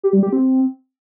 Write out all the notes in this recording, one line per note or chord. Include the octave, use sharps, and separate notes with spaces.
G4
G3
G4
C4